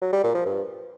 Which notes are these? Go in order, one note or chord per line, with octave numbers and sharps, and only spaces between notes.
F#3
G3
A#2
F3
G2